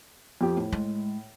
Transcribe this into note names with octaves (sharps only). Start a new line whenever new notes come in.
F2 F3 G4
A2
G#3